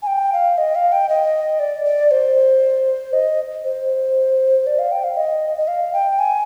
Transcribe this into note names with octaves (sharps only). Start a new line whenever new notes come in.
G#5
G5
F5
D#5
F5
G5
D#5
D5
D5
C5
D#5
C5
D5
F5
G5
F5
D#5
D#5
F5
G5
G#5